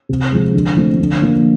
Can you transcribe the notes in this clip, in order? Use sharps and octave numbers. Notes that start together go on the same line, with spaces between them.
C3
F3 G#3
D3
F3 A3 C4
D3
F3 A#3